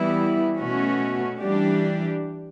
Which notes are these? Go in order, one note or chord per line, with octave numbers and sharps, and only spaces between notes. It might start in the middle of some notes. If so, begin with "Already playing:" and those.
Already playing: E3 G3 B3 E4
B2 A3 C#4 F#4
E3 G3 D4 G4